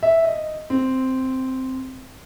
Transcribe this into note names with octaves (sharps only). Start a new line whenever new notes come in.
E5
D#5
C4